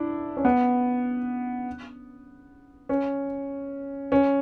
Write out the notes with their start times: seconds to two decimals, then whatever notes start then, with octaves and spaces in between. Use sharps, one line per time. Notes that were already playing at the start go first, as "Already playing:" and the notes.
Already playing: D4 E4
0.37 C#4
0.45 B3
2.89 C#4
4.12 C#4